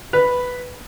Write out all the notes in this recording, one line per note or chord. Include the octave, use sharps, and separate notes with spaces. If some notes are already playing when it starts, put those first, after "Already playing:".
B4